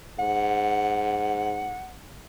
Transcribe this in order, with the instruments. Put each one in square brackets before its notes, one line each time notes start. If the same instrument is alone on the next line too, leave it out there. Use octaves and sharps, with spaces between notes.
[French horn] G#2 [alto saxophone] F#5